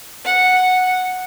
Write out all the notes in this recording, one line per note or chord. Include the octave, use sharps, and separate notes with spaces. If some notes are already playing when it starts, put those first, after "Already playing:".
F#5